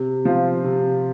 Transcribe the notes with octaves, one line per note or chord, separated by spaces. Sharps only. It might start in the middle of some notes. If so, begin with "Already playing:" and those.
Already playing: C3
F3 C4 F4
C3